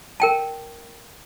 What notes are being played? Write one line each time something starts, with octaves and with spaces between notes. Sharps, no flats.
A#4 G5 A5